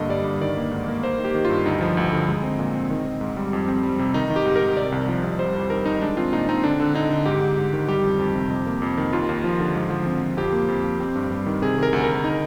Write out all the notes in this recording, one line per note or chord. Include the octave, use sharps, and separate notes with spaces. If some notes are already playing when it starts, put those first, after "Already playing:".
Already playing: G2 D3 A#3 D#5
G3 D5
G2
D#3 D5
A#3
G#2
A#3
A#3 C5
D#3
G4
D#3
F4
G2
D2 D#4
F3
D2
D3
G#3
C4
A#2
C4
D#3
D#3
G#2
G3
F2
C4
G3
C3
D#3 D#4
D#3
G4
G#2
A#4
D#3
C3 D5
C2
F3
C2
G3 C5
F2
D#3 A#4
D#3 D#4
G#3 D4
C4 F4
A#2 D#4
C4 D#4
D3 D4
D3
D3 D#4
D3
G#2 G4
G#2
G#2
D#3
G3 G4
F2
F2
C3
F2
A#3
F2
D#3
D#2 F4
D#2
F3
D3
G#2
F3
C4
F3
F2 G4
A#3
F2
A#3
C4
G2
G3
D#3
C3 G#4
D#3 A#4
D2
D2 A#4
D#4